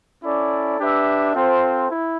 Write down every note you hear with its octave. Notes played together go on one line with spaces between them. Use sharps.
C#4 E4 A4 D5
D4 G4 B4 E5
C4 F4 A4 C5
E4